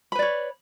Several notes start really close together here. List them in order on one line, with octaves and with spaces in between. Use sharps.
B5 B4 D5 C#5